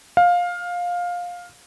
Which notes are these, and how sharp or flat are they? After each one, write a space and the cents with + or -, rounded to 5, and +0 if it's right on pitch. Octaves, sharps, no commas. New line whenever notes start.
F5 +15